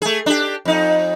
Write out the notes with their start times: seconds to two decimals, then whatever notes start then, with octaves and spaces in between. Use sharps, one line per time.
0.02 A3 G#4
0.26 D4 G4
0.65 F2 D#4